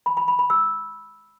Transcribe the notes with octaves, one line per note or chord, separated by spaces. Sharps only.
B5
B5
B5
B5
E6